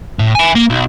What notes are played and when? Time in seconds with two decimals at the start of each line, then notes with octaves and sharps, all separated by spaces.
0.19 A2
0.35 E5 G#5
0.55 A#3
0.70 B1